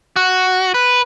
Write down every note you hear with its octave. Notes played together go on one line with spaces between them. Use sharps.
F#4
B4